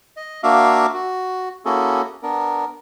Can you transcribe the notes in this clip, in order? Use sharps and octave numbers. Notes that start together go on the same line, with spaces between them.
D#5
A#3 D4 F#4 E5 F5 D6
F#4
A#3 C#4 E4 F#4 G#4 A4
B3 D4 A#4